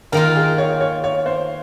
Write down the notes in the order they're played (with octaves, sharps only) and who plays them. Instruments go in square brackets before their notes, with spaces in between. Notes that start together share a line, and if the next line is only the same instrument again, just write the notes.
[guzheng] D#3 A#3 F4 [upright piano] A#4
[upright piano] G#4
C#5
C#5
C#5
C5